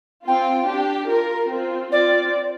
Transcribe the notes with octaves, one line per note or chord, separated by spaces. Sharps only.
C4 F4 G5
D4 G4
F4 A#4
C4 F4
C4 F4 D5